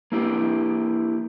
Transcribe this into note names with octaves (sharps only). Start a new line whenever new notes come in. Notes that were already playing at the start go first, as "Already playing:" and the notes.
A#3 E4 G4